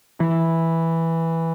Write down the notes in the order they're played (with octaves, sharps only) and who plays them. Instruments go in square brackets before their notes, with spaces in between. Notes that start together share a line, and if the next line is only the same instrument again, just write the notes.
[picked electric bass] E3